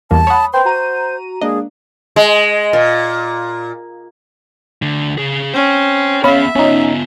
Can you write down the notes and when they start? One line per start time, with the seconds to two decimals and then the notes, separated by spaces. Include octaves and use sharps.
0.11 E2 G3 A#3 A5
0.27 C#5 F#5 B5 D#6
0.53 B4 C5 G5 C6
0.65 F#4 A#5 D#7
1.41 G#3 A#3 D4 G#4 D#5
2.16 G#3
2.73 A#2
4.82 D2 D3
5.18 C#3 G#4
5.54 C#4 C5 G5
6.24 B3 C#4 G#4 E5 F5 B5
6.56 B3 C#4 D#4 F4